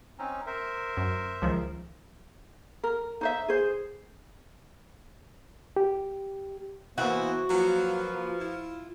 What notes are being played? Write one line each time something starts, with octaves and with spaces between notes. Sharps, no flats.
C4 C#4 D#4
A#4 C5 E5
F#2
C#2 D#3 F3
A#4
D#4 C5 E5
G#4 C5
G4
E3 A#3 B3 E4 F#4 C5
F3 F#3 A#3 F4 B4
E4 F4